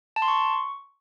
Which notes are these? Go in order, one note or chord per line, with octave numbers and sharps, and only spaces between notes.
A5
C6
C#6